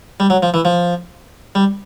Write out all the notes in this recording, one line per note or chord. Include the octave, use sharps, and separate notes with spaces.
G3
F#3
F3
E3
F3
G3